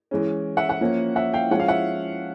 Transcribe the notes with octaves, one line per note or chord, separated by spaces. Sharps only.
E3 G#3 C#4
E5 F#5
E5 F#5
F3 A#3 C#4
E5 F#5
F5 G5
F3 G#3 C#4 F#5
F5
E5 F#5